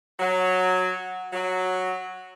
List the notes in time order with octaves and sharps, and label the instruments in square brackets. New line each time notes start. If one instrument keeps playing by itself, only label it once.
[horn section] F#3
F#3